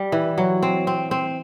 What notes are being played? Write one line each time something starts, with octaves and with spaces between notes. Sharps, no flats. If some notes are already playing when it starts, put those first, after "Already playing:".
Already playing: G3
E3
F#3
C4
C4
C4